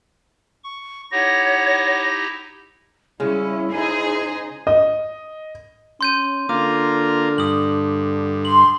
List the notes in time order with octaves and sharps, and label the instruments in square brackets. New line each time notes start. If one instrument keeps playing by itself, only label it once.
[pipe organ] C#6
[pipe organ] D#4 E4 G4 [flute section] C#5 F#5 [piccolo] A#6
[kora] C#3 G#3 [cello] G3 C#4 [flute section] E4
[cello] D#4 C5 [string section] G#4
[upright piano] D#5
[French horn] C#4 [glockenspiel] C6 G6 D#7
[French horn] D3 [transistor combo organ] A#3 F4 [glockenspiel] D6
[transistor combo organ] G2 [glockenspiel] D#6 F#7
[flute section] C6 [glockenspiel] F#7